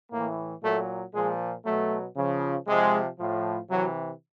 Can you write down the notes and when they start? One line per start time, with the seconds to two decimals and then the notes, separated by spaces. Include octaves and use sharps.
0.12 A2 E3 A#3
0.63 A#2 F#3 A3
1.14 A#2 F3 G#3
1.66 B2 F#3 A3
2.16 C#3 F3
2.67 C3 F3 G#3
3.19 A2 F3
3.70 C3 E3 F#3